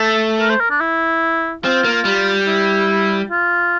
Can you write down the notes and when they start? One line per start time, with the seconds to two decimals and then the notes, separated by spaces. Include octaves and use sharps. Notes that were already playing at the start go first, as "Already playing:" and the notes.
Already playing: A3 A4
0.40 A#4
0.50 C5
0.60 A#4
0.70 D4
0.80 E4
1.64 C4 F4
1.84 A#3
2.05 G3
2.47 E4
3.30 F4